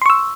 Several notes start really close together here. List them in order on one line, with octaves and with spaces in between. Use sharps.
C6 C#6 E6